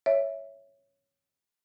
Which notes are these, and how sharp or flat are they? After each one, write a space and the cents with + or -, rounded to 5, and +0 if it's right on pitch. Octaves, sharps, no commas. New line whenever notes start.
C#5 +0 E5 +0